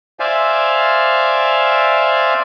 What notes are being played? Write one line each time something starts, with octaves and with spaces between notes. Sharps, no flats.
C5 D5 E5 F5 G#5